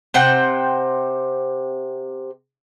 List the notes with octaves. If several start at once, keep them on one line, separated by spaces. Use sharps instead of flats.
C3 C5 F#5 G5